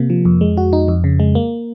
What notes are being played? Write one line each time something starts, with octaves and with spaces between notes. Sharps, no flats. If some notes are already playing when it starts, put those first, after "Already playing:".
Already playing: C3 A#3
F3
F2
G#3
F#4
D#4
F2
C#3
G#3
A#3